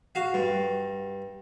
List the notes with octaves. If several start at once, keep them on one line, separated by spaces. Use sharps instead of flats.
F#4 F5
G2